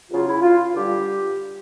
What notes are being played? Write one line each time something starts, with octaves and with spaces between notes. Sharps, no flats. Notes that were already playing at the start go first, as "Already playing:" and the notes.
E2 C#3 F#3 F4
E4
F4
G2 D3 G3 G4